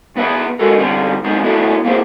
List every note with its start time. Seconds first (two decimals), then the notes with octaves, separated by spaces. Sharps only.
0.15 B1 B3 B4 E5 B5
0.59 G#3 F#4 A4 A#4
0.78 D3 G3 B3 C4
1.24 F#2 G#3 B3 C4 D#4
1.44 A3 B3 D4 E4 F#4 A4
1.85 A#3 C4 E4 G#4 C5